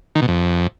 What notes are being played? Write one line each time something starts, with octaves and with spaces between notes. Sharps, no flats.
D#3
B2
F2